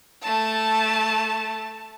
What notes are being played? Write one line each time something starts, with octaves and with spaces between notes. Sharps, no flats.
A3 A5